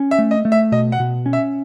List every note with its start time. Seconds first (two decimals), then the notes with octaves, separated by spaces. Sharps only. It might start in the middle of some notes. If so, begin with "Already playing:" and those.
Already playing: C#4
0.11 E5
0.18 A3
0.31 D#5
0.45 A3
0.52 E5
0.72 B2 D#5
0.92 F#5
1.00 B2
1.26 C#4
1.33 E5